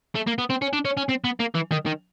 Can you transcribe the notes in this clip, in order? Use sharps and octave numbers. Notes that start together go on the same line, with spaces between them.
A3
A#3
B3
C4
C#4
D4
C#4
C#4
C4
B3
A#3
E3
D#3
D#3